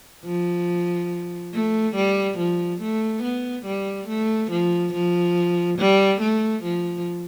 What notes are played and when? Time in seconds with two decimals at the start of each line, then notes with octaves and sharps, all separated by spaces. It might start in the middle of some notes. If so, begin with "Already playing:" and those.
0.26 F3
1.54 A3
1.96 G3
2.38 F3
2.81 A3
3.23 B3
3.66 G3
4.08 A3
4.51 F3
4.94 F3
5.79 G3
6.21 A3
6.64 F3